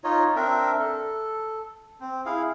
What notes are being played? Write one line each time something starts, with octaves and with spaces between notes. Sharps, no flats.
D#4 F4 C#5 D#5
C4 D4 A#4 E5
A4
C4
E4 G#4 F5